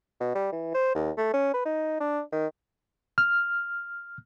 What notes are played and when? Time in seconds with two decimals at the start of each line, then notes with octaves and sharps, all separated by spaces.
0.21 B2
0.35 G3
0.53 E3
0.75 C5
0.95 D#2
1.18 A3
1.34 C#4
1.54 B4
1.66 D#4
2.00 D4
2.32 D#3
3.18 F6